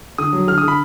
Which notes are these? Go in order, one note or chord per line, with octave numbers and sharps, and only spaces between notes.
D3 D#6
F#3
D3 F6
D#6
D3 B5